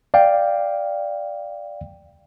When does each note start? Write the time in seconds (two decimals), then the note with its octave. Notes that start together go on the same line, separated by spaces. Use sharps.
0.14 D5 F5 G5